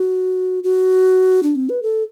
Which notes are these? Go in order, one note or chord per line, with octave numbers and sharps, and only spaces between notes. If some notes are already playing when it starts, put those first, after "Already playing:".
Already playing: F#4
F#4
D4
C4
B4
A4